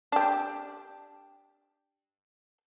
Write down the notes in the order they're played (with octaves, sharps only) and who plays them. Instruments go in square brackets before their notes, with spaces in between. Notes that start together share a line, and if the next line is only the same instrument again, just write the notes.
[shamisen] D4 G4